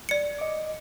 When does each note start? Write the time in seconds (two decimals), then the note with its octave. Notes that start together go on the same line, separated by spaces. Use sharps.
0.09 D5 C#7
0.39 D#5 D6